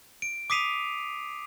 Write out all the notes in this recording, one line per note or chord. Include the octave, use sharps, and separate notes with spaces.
D7
D6 D#6 B6 C7 D#7 F7